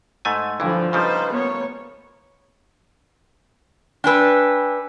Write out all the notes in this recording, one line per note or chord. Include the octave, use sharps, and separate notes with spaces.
G#2 A3 G#5
G2 D3 E3 F3
C#3 F3 G3 D#4 B4 C5
A#3 B3 C#5
D4 B4 G5 G#5 E6